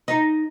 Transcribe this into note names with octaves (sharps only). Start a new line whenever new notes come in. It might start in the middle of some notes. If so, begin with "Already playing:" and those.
D#4